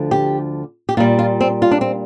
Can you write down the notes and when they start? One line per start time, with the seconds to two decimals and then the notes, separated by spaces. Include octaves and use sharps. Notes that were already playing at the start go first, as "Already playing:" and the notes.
Already playing: D2 D3 F3
0.11 G4
0.89 G4
0.97 A#2 F4
1.00 G3
1.19 F4
1.41 C4
1.62 F4
1.71 D4
1.81 C4